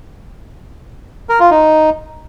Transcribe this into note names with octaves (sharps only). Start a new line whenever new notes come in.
A#4
F4
D#4